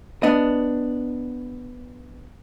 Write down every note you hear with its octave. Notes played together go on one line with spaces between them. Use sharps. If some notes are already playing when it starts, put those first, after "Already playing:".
B3 D4 D#5